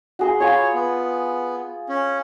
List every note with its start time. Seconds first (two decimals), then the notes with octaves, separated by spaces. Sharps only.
0.19 F#4 G#4 C6
0.40 F4 C#5 G#5 B5
0.74 B3
1.89 C#4